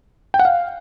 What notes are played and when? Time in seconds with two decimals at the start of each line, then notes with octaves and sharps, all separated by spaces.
0.34 G5
0.39 F#5
0.45 F5